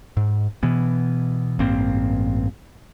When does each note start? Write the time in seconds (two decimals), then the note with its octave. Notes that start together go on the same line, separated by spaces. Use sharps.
0.17 G#2
0.63 B2 E3 B3
1.59 A1 G2 A#3 C4